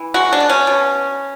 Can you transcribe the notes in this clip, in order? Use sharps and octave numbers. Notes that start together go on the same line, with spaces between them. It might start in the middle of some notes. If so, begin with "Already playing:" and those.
Already playing: E3
G#3 F#4
D4
B2
C#4
B2